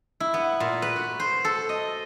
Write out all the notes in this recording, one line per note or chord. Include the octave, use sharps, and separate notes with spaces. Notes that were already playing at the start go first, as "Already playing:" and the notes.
E4
B3
A#2
B4
F#4
C5
A4
D#5